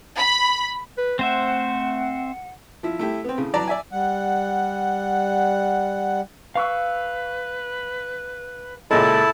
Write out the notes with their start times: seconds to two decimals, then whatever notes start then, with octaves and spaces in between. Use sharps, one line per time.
0.16 B5
0.98 B4
1.19 A3 C4 C5 E5 F#5
2.83 F3 E4
2.99 A3 E4 G4
3.24 B3 C4
3.38 A2 C#3
3.54 E3 F#3 D5 A5 A#5
3.68 D5 E5 G#5
3.92 G3 F#5
6.56 B4 F5 C#6 E6
8.91 C#2 A#2 G#3 E4 A4 A5